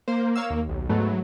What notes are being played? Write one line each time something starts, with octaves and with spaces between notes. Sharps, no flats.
A#3 C5
C#5 F5 E6
D#2
B1
G#2 F#3 A3 B3